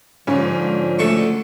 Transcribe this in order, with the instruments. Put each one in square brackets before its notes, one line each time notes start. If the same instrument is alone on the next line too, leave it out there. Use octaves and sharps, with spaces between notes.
[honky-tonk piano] G#2 C#4 [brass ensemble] D3 F3
[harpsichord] D2 A4 C#6